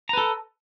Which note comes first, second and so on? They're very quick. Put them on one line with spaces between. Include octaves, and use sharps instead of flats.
A#5 B4 A4